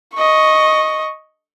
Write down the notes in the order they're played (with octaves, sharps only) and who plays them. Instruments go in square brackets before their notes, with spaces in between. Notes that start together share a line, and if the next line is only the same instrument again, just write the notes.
[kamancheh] D#5 C#6